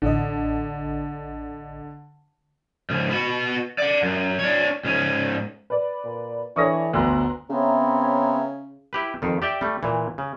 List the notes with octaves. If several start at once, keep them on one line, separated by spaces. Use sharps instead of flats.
A1 D3 D#5
C#2 G#2
B3 F#4
D5 F#5
F#2
D4 C#5
G#2 C#4
B4 D5
A#2
E3 D4 A4 C#5 C#6 D#6 A#6
G1 D2 B3 A#5 C6 F#6
C#3 B3 C4 C#5 E5 A#5
E4 G4 B4
F2 D#3
G4 D5 E5 G5
G3 A3
A#2 E3
C#3